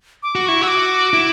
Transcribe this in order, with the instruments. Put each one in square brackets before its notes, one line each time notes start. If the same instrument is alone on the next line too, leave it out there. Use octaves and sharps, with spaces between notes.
[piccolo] D6
[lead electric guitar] F#4
[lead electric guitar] E4 [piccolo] C#6
[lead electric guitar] F#4 [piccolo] E6
[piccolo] D6
[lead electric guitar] E4